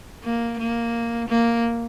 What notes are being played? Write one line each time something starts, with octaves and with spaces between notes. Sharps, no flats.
A#3
A#3
A#3